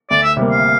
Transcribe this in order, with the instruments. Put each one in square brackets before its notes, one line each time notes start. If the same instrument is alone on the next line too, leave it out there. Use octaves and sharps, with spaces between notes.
[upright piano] D2 [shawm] D5
[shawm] E5
[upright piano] C3 G3 A#3
[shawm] F5